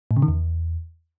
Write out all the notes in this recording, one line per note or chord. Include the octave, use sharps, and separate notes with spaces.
A2
C#3
D#3
E2